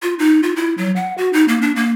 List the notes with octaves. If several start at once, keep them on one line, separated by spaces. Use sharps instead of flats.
F4
D#4
F4
E4
F#3
F#5
F#4
D#4
A#3
D4
A#3